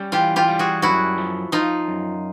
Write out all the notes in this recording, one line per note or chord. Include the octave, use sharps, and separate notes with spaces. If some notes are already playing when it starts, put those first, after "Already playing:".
Already playing: G3 C#4
E3 F4 G4
F4 G4
G3
F#4 G#4
F#2 E4 F#4
F3
F3 D#4 F4
F#2